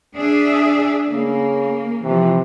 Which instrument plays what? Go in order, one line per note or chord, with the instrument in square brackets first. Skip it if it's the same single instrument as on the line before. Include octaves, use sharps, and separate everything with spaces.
[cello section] D4 G#4 E5
[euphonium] C#3 [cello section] A#3
[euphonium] C3 [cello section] E3 F3